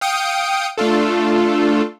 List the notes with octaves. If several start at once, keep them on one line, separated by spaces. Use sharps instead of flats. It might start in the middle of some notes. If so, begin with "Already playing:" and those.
F5 G5 D#6 C#7 D7
A3 D4 F4 A4